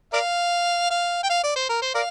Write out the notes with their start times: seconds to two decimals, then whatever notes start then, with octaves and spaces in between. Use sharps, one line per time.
0.13 A#4 D5 F5
0.90 F5
1.23 G5
1.30 F5
1.43 D5
1.56 C5
1.69 A#4
1.82 C5
1.95 A#4 D5 F5